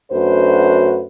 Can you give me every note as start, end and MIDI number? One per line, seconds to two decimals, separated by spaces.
0.11 1.05 42
0.11 1.05 57
0.11 1.05 62
0.11 1.05 66
0.11 1.05 71
0.11 1.05 72